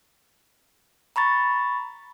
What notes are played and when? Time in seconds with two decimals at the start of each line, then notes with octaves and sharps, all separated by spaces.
1.16 A#5 B5 C#6 A6